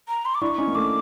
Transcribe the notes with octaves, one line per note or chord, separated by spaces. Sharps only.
A#5
C6
D6
D4 E4 C#6
C#4 D#4
A#3
A3 D6